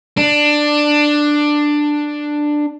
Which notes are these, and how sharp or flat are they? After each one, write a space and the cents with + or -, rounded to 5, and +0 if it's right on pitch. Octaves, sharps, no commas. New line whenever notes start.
D4 +10